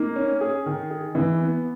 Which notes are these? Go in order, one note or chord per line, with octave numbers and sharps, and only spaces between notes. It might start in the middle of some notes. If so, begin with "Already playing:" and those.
Already playing: A#3 D#4
C#4
G#4
D#3
G#4
E3
B3